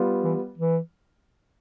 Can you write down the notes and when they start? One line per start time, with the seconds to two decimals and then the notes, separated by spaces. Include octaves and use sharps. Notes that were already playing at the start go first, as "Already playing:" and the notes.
Already playing: G3 B3 F4
0.24 E3
0.58 E3